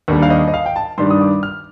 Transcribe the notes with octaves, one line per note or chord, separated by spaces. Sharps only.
D#2 D3 G3 A#3
F5
D#5
D#5
F5
G5
A5
G2 D#3 G3 D4 C6
D#6
D6
F6